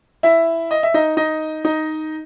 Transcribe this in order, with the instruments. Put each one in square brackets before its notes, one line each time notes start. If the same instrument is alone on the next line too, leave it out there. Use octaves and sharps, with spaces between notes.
[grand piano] E4 E5
D#5
E5
D#4 D#5
D#4 D#5
D#4 D#5